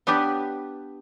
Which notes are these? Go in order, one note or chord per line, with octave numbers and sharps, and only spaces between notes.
B3 D4 G4 B4